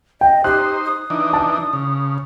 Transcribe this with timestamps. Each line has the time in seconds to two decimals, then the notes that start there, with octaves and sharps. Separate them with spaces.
0.21 D#5 G5
0.44 D#4 G4 C5 F#6
0.84 D#6
1.10 E3 D4 D#4
1.33 A5
1.73 C#3